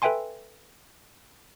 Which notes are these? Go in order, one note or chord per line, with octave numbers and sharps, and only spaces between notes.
A4 B4 E5 G5 G#5 C6